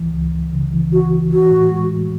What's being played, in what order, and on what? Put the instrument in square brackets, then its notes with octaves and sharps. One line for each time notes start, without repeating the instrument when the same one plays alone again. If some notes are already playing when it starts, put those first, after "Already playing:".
Already playing: [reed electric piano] C#2 E3
C#2
C#2
C#3
E3
[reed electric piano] E3 [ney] F#4
[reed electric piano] E3
[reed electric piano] E3 [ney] F#4
[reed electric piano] A2
G#3
A2